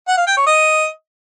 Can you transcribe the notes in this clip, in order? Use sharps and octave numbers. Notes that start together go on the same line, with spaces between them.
F#5
F5
G5
C#5
D#5